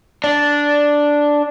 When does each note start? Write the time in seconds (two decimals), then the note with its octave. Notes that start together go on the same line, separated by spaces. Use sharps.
0.24 D4